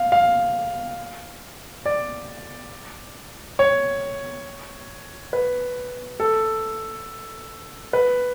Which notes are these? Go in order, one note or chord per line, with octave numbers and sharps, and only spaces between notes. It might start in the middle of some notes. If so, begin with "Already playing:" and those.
Already playing: F5
F5
D5
C#5
B4
A4
B4